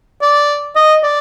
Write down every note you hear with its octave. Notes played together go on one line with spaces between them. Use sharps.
D5
D#5
D5